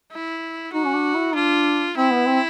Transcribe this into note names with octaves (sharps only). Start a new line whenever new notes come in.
E4
D#4 F#4
C#4
D4
E4
D4 F4
C4 E4
B3
C4